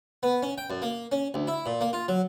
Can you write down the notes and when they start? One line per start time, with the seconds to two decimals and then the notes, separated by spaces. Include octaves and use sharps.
0.23 B3
0.43 C#4
0.58 G5
0.70 F#2
0.82 A#3
1.12 C#4
1.34 D2
1.47 E4
1.66 A#2
1.81 A#3
1.93 F4
2.08 F#3